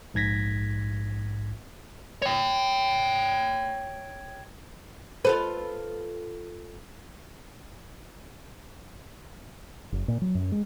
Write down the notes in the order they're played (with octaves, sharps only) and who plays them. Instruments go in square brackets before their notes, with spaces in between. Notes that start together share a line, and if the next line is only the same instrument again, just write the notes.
[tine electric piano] A#1 G#2 G#6 A#6 B6
[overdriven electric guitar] C#5 G5
[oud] F4 A4 B4 [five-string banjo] C5
[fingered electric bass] F#1
A#2
F#3
F#2
G#3